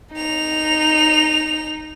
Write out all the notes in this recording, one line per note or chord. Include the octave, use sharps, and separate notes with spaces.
D#4 F7